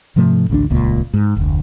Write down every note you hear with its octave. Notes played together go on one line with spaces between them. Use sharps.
G#2 C3 F3 A3
A1 D2 A3 D4
D#1 C#2 A#2
G#2
F1 D2